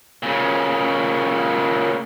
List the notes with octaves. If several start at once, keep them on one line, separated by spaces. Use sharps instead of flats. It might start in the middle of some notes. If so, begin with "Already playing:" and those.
A#2 C#3